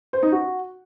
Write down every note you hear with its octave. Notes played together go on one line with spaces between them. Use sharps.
C5
D#4
F#4